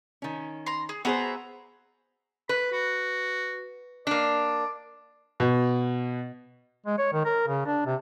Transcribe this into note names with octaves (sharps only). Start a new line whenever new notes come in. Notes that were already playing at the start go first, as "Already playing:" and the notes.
D#3 C#4
A#5 C6
G#4
B3 F#4 G#4 C5 E5 A#5
B4 B5
F#4
A#3 D4 D5
B2
G#3
C#5
D#3
A#4
C#3
D4
C3